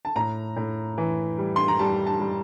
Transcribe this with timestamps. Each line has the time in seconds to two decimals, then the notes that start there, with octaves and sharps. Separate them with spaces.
0.05 A5
0.16 A2 A#5
0.56 A2
0.98 E3
1.38 G3
1.56 C6
1.68 A#5
1.79 G3 A5
2.07 A5
2.20 G3